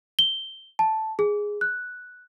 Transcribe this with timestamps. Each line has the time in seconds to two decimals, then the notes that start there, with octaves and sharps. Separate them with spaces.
0.19 G7
0.79 A5
1.19 G#4
1.61 F#6